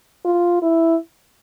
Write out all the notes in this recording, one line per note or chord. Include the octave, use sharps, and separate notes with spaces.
F4
E4